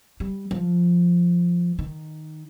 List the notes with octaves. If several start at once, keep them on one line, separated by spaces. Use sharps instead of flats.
G3
F3
D#3